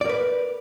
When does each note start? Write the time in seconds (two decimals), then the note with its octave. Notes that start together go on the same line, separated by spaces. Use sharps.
0.01 D5
0.05 A#4
0.09 B4